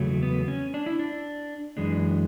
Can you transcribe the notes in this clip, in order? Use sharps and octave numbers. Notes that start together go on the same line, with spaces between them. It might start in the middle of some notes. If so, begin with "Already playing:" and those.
Already playing: E2 C#3 F#3 A3
B3
C#4
D4
E4
D4
F#2 E3 G#3 D4